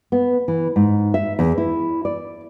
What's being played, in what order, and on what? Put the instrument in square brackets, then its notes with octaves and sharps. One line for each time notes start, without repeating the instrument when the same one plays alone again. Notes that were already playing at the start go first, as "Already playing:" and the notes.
[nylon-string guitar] B3
E3
G#2
E5
E2
E4
D5